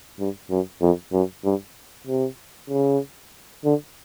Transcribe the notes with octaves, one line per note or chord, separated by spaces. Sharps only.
G2
F#2
F2
F#2
G2
C3
C#3
D3